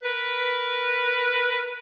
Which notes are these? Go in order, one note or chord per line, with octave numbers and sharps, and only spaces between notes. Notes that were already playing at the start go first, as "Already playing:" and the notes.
A#4 B4